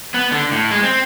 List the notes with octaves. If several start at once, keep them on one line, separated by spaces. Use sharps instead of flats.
B3
D3
A2
G#3
C4